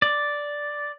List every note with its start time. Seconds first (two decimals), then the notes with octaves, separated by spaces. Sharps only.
0.02 D5